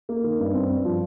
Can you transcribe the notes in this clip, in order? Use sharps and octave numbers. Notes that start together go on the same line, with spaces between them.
A#3
D#3
G2
C4
G2
F3